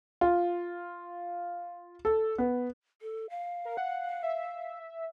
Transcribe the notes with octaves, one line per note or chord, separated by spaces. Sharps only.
F4
A4
B3
A4
F5
A#4
F#5
E5